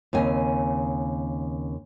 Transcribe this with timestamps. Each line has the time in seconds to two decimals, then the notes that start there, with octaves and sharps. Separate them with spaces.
0.13 D#2 C#3 C4 G#5